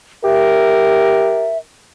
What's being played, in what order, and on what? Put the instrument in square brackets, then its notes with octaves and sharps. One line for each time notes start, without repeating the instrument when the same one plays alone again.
[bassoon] G4 [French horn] A#4 [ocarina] E5